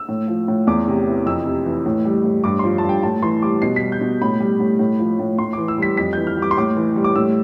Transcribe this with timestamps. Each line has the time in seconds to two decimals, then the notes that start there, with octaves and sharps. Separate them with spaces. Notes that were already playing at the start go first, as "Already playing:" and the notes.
Already playing: E6
0.09 A2
0.28 F3
0.48 A2
0.67 E2 D6
0.88 C3
1.07 E3
1.26 F2 E6
1.46 C3
1.65 E3
1.86 A2
2.05 G3
2.24 A2
2.44 G2 D6
2.59 F3 C6
2.78 A5
2.84 G2
2.89 G5
3.03 A2 A5
3.23 E3 C6
3.42 G3 D6
3.62 B2 C7
3.76 B6
3.82 G3
3.92 G6
4.01 B2
4.22 A2 B5
4.40 G3
4.60 A2
4.79 A2
4.99 F3
5.19 A2
5.39 A2 C6
5.53 E3 D6
5.68 E6
5.78 G3 B6
5.97 F2 B6
6.13 E3 G6
6.27 F6
6.37 G3
6.42 D6
6.51 C6
6.57 A2 D6
6.77 E3
6.96 G3
7.04 D6
7.16 A2 E6